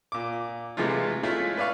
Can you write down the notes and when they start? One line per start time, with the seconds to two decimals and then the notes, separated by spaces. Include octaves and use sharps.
0.12 A#2 D6
0.77 C3 E3 F3 G#3 A3 F4
1.23 G#3 A3 C#4 E4 F4 G#4
1.57 B4 D5 E5 F5 C#6